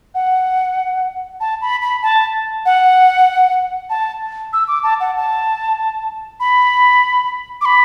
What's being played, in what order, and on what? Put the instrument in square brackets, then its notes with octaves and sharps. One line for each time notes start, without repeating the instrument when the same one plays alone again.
[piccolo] F#5
A5
B5
B5
A5
F#5
A5
E6
D6
A5
F#5
A5
B5
D6
B5